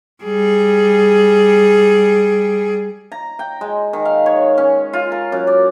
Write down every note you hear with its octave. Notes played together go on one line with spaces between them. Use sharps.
G3 G#4
A#5
G5
G#3
D#3
F5
C#5
C#4
F4
A#4
F#2
D5